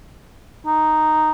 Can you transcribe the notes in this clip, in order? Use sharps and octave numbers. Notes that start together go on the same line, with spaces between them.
D#4